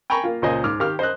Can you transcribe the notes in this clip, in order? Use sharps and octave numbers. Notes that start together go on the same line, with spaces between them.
G5 G#5 A#5 B5 C#6
A#3 F4
C#2 A#2 C5 D#5 G#5
G#2 D6 F6
D#3 G4 F5 F6
C5 D#5 F#6